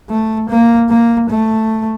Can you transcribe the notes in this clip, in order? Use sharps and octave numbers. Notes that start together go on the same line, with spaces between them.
A3
A#3
A#3
A3